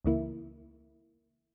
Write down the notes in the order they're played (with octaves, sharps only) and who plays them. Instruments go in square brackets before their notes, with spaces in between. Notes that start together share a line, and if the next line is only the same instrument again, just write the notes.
[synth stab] C#2 C#3 E3 A#3 E4